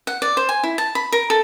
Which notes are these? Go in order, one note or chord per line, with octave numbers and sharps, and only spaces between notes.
F#5
D5
C5
G#5
E4
A5
B5
A#4
A4